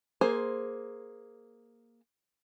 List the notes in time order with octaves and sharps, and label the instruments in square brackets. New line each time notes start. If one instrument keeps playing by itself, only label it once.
[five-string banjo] A#3 G#4 C5